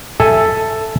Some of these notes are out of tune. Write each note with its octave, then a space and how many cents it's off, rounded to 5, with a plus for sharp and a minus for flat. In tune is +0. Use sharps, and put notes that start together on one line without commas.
A4 +0 E5 +5 G#5 +0